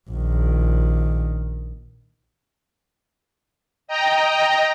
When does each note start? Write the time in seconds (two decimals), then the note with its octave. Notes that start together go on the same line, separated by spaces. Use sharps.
0.11 A#1 D#3
3.88 D#5 G5 A#5